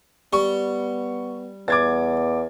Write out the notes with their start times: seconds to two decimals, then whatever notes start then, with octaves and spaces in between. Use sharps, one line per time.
0.33 G3 B3 C#6
1.68 E2 B3 D6 G#6 A6